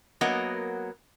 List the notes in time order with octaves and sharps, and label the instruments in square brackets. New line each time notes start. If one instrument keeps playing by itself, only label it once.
[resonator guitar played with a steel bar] F#3 A#3 B3 A#4 D#5 F#5